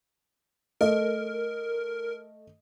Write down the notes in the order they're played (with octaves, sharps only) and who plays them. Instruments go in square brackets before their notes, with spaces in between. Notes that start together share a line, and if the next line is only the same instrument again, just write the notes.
[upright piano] A3 D#5 [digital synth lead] A#4